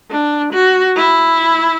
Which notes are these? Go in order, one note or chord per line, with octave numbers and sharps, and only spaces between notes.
D4
F#4
E4